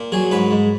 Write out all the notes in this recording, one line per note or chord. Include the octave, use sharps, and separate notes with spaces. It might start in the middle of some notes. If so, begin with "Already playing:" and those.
Already playing: A#2
F#3 G#4
G#2 B4
G#2